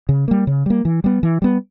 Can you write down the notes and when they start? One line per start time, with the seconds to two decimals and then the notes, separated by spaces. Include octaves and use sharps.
0.09 C#3
0.28 G3 A#3
0.47 C#3
0.66 G3 A#3
0.85 E3
1.04 G3 B3
1.23 E3
1.42 G3 B3